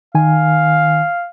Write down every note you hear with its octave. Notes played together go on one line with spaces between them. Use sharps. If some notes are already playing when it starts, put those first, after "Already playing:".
D#3 F5 G#5